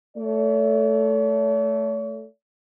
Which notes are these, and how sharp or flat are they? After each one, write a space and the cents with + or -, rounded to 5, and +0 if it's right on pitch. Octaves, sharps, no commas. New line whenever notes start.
A3 +0 C#5 +45